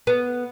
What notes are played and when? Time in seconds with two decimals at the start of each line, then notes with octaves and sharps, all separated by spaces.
0.07 B3